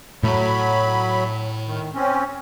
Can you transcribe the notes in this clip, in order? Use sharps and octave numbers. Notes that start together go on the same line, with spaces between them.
A2 F#3 A3 B5
D#3
C4 C#4